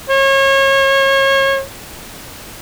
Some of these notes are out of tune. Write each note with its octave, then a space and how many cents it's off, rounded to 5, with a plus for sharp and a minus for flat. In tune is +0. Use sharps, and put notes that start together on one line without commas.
C#5 -30